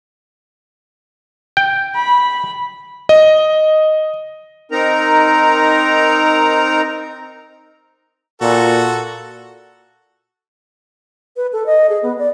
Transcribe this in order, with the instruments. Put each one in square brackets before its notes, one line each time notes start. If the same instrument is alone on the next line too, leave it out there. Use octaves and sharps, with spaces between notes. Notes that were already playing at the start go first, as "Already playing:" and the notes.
[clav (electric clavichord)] G5
[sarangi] B5
[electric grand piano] D#5
[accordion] C4 D#4 A#4 A#5
[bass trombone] A#2 [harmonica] F#4 A4
[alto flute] B4
A4
D#5
G#4
B3
D5